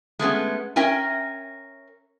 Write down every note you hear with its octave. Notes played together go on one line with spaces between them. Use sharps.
G#3 A3 B3 C#4
C#4 A#4 E5 G5 G#5